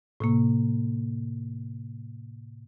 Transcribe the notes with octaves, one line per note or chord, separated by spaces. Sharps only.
A2 C3 A#3